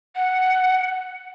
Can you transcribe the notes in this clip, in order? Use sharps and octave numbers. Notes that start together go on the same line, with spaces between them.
F#5